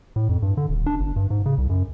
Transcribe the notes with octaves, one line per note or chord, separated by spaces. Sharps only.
A2
F2
G2
D3
D#1
D4
G1
G2
G#2
C#3
C2
F#2